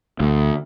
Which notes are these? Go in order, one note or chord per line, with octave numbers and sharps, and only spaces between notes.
D2